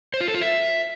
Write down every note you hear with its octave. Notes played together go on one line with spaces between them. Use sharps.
C5
F4
A4
F4
E5